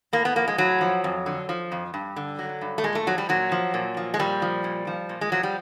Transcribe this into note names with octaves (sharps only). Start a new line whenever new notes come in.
A2 A#3
B3
F3 A#3
G#3
A2 F#3
F3
F2
D3
F3
F2
G2
D3
F#3
G2
A3
A#2 G#3
A3
F3 F#3
G3
A#2 F#3
F3
A#2
F3
G#3
A#2 G3
F3
A#2
F3
A#2
G#3
F3 F#3
G3